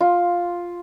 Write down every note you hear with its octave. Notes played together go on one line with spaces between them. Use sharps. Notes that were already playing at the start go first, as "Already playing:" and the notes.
F4